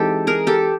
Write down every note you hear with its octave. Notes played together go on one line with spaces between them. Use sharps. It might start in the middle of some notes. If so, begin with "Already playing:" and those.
Already playing: E3 G#3 C4 D#4 G4 A4
G#4 A#4
G4 A4